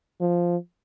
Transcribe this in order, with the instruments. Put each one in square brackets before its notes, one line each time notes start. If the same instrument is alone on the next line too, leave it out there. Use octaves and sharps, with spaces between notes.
[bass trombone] F3